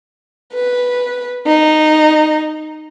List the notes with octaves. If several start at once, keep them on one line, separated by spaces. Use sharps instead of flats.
B4
D#4